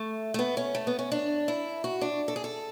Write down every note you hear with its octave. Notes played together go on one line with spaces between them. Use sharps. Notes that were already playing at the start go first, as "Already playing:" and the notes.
Already playing: A3
A3
B3
C#4
A3
B3
C#4
D4
E4
F#4
D4
A4
G#4
A4